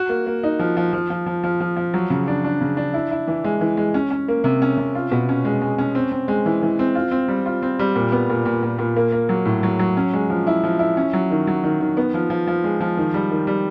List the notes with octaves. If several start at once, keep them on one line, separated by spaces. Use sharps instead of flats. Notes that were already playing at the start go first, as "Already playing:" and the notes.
Already playing: F#4
A#3
A#3
D#4
F3
F3
F3
F3
F3
F3
F3
F3
F#3
C#3
D4
D4
C#3
D4
E4
E4
E3
G#3
E3
G#3
C#4
C#4
A#3
C3
C#4
C3
F4
B2
C#4
G#3
G#3
C#4
C4
C4
G#3
E3
E3
C4
F4
C4
G3
F4
C4
G3
A#2
B3
A#2
A#2
A#2
A#2
A#3
A#3
F#3
A2
F#3
F#3
C#4
G#3
F3
E4
F3
E4
C#4
F#3
D#3
F#3
D#3
D#3
B3
F3
F3
F3
G#3
F3
D#3
G3
D#3
G3